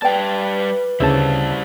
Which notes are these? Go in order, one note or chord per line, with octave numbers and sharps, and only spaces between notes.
G3 B4 D5 G5 A5
D2 C#3 G3 E4 C5 A5